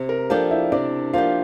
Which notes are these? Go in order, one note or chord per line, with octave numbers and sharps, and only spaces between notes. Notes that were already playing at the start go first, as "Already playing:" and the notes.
Already playing: C3
A#4 A#5
F3 A#3 D4 G4 A4 A5
E4 E5
C3 D4 D5
F3 A#3 D4 F4 G4 F5